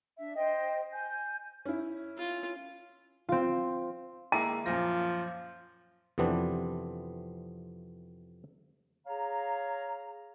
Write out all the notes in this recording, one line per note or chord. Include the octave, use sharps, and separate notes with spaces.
D4 E5
C5 D#5 G5
G#5 G6
C#4 E4
F4
C4 F4
G#3 A#3 E4 A#5
F#2 A#2 F3 A#6
F2 C3 E3 B3 C4 D4
G#4 C#5 F5 A#5